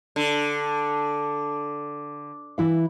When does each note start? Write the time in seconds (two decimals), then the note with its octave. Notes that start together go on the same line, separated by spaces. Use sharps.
0.16 D3
2.58 E3 E4 F5